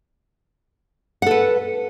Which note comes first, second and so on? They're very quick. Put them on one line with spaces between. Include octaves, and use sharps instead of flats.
F#5 A4 B4